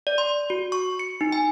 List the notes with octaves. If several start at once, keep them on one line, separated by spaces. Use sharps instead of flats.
D5
C6
F#4
C#6
C#7
D#4
G#5